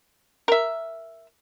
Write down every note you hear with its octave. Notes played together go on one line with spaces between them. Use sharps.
A#4 E5